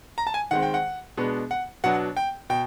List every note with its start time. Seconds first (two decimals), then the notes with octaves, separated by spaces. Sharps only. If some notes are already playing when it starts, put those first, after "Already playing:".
0.18 A#5
0.27 A5
0.34 G#5
0.51 D#3 G#3 C4 F#5
0.63 G5
0.74 F#5
1.17 B2 G#3 B3 D4
1.51 F#5
1.84 B2 F#3 B3 D4 F#5
2.17 G5
2.50 B2 G5